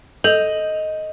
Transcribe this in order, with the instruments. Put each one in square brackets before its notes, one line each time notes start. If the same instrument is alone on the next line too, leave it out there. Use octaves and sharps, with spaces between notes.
[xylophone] A4 G6 F7 [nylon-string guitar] D#5